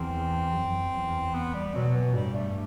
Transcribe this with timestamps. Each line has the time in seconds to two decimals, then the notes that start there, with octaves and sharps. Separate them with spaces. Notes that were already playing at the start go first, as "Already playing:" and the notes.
Already playing: E2 C4
0.54 F#2
0.95 E2
1.34 B3
1.54 G3
1.74 B2 F#3
1.95 E3
2.15 G2 G3
2.35 A3